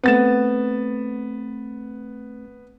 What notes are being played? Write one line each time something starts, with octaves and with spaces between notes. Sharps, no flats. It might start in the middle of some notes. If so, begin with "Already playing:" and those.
A3 B3 C4 A6 E7